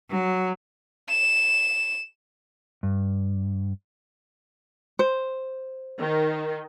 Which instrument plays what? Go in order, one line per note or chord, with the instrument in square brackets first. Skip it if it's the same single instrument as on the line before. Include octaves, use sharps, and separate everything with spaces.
[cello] F#3
[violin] E7
[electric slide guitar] G2
[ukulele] C5
[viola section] D#3